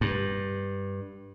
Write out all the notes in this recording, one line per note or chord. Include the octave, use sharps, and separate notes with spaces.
G2